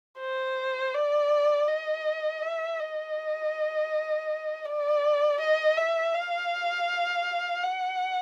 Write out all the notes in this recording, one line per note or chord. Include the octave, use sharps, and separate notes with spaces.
C5
D5
D#5
E5
D#5
D5
D#5
E5
F5
F#5